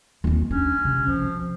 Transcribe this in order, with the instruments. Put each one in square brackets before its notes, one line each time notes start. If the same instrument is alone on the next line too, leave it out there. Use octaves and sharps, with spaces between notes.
[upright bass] D#2 C4
[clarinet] C#4 [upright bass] D4
[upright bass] C3
[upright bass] B2 C4 [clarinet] F3